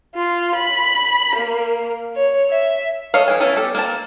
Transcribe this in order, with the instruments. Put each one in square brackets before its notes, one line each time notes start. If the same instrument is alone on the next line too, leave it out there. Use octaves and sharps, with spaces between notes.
[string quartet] F4
B5
A#3
C#5
E5
[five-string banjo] A4 C#5 D#5 F5
E3 G#5
B3 C#4 E4 A4
G4 A4
A#3 C4 A5